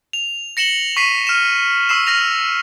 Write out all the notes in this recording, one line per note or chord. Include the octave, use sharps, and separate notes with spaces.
F7
A#6 C#7 E7 F#7 G7
C#6 B6 C7 D#7
F6 E7
C#6 E6 C7 E7
F6 A#6 F7